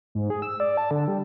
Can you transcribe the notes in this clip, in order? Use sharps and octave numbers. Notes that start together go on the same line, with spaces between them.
G#2
G#4
E6
D5
A5
D3
G3